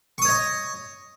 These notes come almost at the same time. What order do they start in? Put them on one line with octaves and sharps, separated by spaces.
C#6 D#6 C#5 D#5